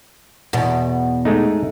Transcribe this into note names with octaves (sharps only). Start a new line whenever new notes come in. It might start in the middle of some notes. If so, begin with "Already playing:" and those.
E2 B2
G#3 A3 D#4